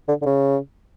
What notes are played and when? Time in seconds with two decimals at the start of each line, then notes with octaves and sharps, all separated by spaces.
0.08 D3
0.22 D3
0.26 C#3